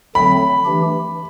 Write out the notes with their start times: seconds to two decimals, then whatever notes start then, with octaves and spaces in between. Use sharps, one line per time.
0.15 D3 F#3 A3 C4 B5
0.65 E3 A3 D4 G4